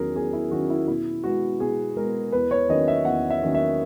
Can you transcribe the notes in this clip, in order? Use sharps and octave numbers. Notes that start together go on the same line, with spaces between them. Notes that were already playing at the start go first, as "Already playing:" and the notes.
Already playing: E2 D#3 F#3 C#4 G#4 A#4
E2 G#4
E4
D#3 F#3 C#4 F#4
E4
B2 E4
G#3 B3 F#4
B2 G#4
G#3 A#4
B3
E2 B4
C#5
D#3 F#3 A#3 C#4 D#5
E5
E2 F#5
E5
D#3 F#3 A#3 C#4
E5